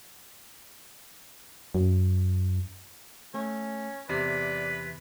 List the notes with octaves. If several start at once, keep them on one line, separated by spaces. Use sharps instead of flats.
F#2
A3 C#4
E2 C3 B4 D5